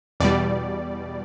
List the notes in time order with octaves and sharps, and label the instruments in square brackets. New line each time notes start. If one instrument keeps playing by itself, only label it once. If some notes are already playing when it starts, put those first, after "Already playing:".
[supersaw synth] E2 B2 G3 D5